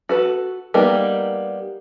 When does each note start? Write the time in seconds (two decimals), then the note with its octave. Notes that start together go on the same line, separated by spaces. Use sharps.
0.09 F#4 A4 B4
0.74 G3 A#3 B3 D#4 G5